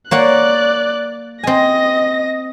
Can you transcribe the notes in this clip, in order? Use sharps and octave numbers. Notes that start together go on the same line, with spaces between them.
A#3 C#5 D5 F#5 F#6
C4 D#5 G#5 A#6